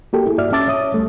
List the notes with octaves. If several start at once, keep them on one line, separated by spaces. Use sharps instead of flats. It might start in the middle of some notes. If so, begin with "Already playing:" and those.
A#3 F#4 G4 A4 A#4
E4 G#4
G2 F#4 D5 E5 F6
C#4 E5 A5 D6 E6 A6
C#5 E5 D#6
C2 G3 A3